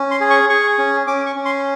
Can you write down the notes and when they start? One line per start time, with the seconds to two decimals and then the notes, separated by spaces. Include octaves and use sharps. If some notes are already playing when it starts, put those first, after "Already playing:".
Already playing: C#4
0.11 C6
0.21 G#4
0.30 C#6
0.49 G#4 C#6
0.78 C#4
1.07 C#4 D6
1.26 C#6
1.36 C#4
1.45 C6